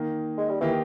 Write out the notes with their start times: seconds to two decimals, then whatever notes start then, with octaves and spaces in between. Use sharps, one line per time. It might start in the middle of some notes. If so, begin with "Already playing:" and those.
Already playing: D#3 A#3 D#4
0.38 G#3
0.49 G3
0.60 D#3 E3 A#3 D#4 G4